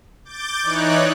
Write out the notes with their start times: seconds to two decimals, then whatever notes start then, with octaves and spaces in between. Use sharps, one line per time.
0.25 D6 G6 A6
0.63 E3 D#4 C#5 D5 F#6